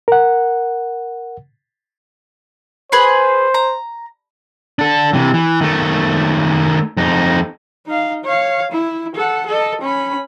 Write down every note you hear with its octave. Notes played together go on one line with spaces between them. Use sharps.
A#4 F#5
G#4 B4 C5 C6
A#5
D4 A4
C3 E3
E3
D#3 A3
F2 D#4
D#4 F5
C#5 F5
E4
A4 F#5
A4 D#5
C#4 B5